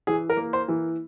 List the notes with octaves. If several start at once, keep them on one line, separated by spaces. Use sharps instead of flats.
E3 G#4
A#4
A#3
C5
E3